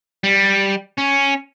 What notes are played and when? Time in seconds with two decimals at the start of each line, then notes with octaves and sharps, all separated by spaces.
0.24 G3
0.98 C#4